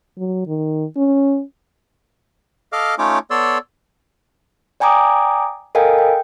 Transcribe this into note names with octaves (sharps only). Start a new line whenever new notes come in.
F#3
D#3
C#4
A4 D#5 F5 D6 F6
A3 C#4 D#4 F4 C#5 D6
B3 A4 C#5 D5 C6 E6
D5 G5 G#5 A#5 D6 D#6
A4 A#4 D#5 F5 G5 G#5
G5